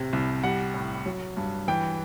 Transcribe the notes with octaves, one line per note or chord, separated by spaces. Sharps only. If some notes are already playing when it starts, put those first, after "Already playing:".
Already playing: A2 C3
C2
G3 F#5
A2
F#3
G2
E3 G5